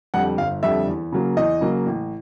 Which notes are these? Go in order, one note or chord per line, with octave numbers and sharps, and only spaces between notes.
F2 D3 G3 F#5
G1 F5
F2 D3 G3 E5
E2
C#3 F#3 A#3
E2 D#5
C#3 F#3 A#3
A1